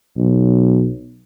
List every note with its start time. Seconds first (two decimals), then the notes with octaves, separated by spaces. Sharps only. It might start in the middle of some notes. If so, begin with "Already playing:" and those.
0.17 B1